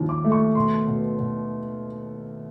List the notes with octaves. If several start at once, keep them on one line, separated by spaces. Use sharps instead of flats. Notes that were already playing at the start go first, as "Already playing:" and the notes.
Already playing: D#2 F3 G3
D6
A3
C#6
B2 C6
B2
B2